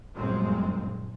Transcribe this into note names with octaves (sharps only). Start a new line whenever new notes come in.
G1 F#2 A#2 G#3 C4